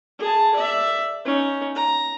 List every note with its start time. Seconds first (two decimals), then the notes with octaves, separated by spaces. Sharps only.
0.19 G#4 A5
0.55 D5 E5
1.25 C#4 D#4
1.75 A#5